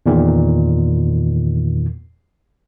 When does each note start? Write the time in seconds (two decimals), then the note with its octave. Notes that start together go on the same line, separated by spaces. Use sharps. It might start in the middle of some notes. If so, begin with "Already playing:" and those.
0.06 E2 A#2 D#3